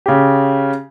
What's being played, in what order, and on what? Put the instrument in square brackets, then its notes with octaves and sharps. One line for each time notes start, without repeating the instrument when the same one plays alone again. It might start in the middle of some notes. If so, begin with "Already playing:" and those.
[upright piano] C#3 G4